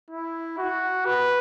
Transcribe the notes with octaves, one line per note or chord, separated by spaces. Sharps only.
E4
F#4
B4